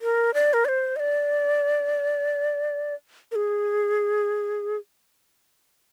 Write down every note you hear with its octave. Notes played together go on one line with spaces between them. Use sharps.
A#4
D5
A#4
D5
C5
D#5
D5
A#4
G#4